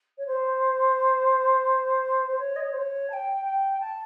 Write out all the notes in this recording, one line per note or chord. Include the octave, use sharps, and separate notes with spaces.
C#5
C5
C5
C#5
D#5
C#5
C5
C#5
A5
G5
G5
A5